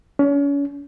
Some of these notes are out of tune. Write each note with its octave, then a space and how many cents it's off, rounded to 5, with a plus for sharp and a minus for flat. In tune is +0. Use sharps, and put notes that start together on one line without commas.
C#4 +35